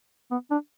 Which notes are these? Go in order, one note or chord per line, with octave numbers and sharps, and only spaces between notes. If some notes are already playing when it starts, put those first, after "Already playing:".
B3
D4